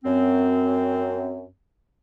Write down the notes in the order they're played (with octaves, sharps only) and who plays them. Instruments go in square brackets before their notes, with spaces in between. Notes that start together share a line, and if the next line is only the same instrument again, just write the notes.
[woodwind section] F#2 C4